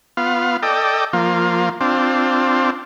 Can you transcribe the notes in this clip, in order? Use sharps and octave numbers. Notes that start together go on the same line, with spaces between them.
B3 F4 F5
A4 D5 D#5 G5
F3 A#3 F4
C4 D4 F4